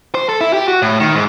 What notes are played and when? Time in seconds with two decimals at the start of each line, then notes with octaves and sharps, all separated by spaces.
0.15 C5
0.29 A4
0.41 E4
0.53 G4
0.68 F#4
0.82 A2
1.00 D#3
1.15 G#2